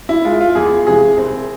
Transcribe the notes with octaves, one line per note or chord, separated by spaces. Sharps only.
E4
G#3 F4
F4
E2 G#4
C3 E3 G#3 G#4
C2 C4